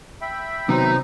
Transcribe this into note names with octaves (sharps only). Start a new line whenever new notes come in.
E5 G5 B5
C3 D#3 F#3 B3 D#4 C5 A#5